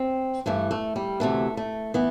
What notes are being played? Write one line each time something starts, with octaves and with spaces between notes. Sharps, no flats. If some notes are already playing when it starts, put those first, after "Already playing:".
Already playing: C4
G2 E3 A3
A3
G3
D2 C3 E3 A3
A3
E3 B3